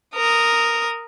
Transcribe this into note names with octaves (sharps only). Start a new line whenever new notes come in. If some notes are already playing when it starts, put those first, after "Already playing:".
A#4 D#6